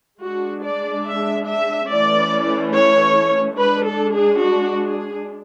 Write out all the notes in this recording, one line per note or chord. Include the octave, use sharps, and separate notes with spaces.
G#3 D4 F#4
D5
E5
E5
E3 A3 C#4 D5
C#5
G#3 D4 B4
A4
G#4
F#4
G#4